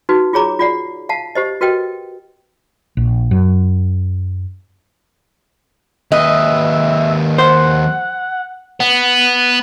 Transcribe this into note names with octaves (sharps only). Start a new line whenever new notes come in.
D#4 F#4 B4
F4 G#4 C#5 A#5 D6
F4 D5 F#5
F5 F#5 A5
G4 C5 D#5
F#4 A#4 B4 D#5 G5
A#1
F#2
D#2 B4 D#5 E5
C5 F#5
B3